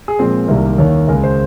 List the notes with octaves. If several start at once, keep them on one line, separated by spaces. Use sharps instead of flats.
G#4
A#2 F3 G#3 C4
C2 C3 D#3 G3 A#3 A#4
D#2 D#3 A#3 C#5
C#2 C#3 G#3 A#4
C5